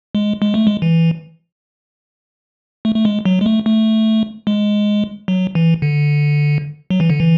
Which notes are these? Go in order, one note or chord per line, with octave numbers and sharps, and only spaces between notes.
G#3
G#3
A3
G#3
E3
A3
A3
G#3
F#3
G#3
A3
A3
G#3
F#3
E3
D3
F#3
E3
D3
E3